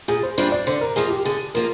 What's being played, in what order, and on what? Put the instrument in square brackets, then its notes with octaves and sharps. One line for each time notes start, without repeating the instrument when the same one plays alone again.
[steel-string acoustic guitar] A#2 [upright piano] G#4
[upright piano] C5
[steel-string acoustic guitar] G3 A#3 D4 F4 [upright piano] C5
[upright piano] D5
[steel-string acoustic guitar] D3 [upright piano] C5
[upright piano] A#4
[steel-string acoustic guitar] F3 A#3 F4 [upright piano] G#4
[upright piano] G4
[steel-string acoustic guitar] D3 [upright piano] G#4
[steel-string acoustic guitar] F3 A#3 F4 [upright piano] A#4